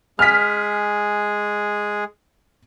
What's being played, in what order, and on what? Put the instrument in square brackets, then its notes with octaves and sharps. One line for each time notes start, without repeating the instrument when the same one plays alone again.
[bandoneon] G#3 G#4 [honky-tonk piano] F6 B6